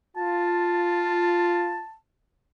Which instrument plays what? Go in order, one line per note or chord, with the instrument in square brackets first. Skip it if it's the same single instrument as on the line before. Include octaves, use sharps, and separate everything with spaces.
[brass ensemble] F4 [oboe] A5